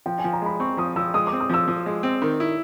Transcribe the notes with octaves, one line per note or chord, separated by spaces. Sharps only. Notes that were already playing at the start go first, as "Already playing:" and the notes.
F3 G5
G#5
F3
A#5
G#3 B5
C4 C#6
F3 D#6
F3 E6
G#3 D#6
D6
C4
D#6
F3 E6
F3
G#3
C4
D#3
E4